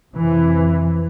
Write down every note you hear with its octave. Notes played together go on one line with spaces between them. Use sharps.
F2 C3 E3